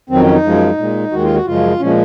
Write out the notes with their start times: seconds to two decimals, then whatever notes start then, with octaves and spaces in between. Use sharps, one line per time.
0.10 F2 D#3 F#3 C4
0.21 C#4
0.32 D#4
0.44 F#2 F3 G#3
0.77 A#2 G#3
1.12 D#2 D#3 G#3 F#4
1.23 F4
1.34 F#4
1.45 F#2 C#3 F3 G#3 F4
1.79 A#2 F3 G#3 C#4